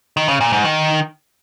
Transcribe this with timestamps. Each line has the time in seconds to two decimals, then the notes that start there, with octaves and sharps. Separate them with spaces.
0.17 D#3
0.29 C#3
0.41 A#2
0.52 G#2
0.64 D#3